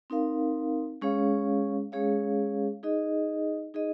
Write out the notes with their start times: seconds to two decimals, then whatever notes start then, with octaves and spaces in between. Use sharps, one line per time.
0.10 C4 D#4 A#4 F5
1.02 G#3 C#4 G#4 C#5 F5
1.92 G#3 C#4 G#4 C#5 F5
2.83 D#4 G#4 D#5
3.74 D#4 G#4 D#5